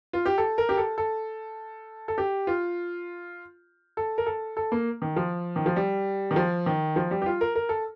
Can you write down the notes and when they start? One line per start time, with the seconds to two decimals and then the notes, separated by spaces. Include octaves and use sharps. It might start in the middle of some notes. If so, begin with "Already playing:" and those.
0.13 F4
0.26 G4
0.38 A4
0.58 A#4
0.69 G4
0.78 A4
0.98 A4
2.08 A4
2.18 G4
2.47 F4
3.97 A4
4.18 A#4
4.26 A4
4.57 A4
4.72 A#3
5.02 D#3
5.16 F3
5.56 D#3
5.66 F3
5.76 G3
6.31 D#3
6.36 F3
6.66 D#3
6.96 F3
7.11 G3
7.22 G4
7.26 F4
7.41 A#4
7.55 A#4
7.69 A4